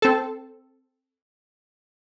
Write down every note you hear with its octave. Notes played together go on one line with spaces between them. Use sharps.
C4 A4